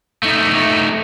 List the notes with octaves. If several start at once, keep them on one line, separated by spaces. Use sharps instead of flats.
A3 D#4